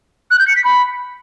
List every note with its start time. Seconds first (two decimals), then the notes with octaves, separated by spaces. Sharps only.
0.31 F#6
0.39 G6
0.47 C#7
0.56 B6
0.64 B5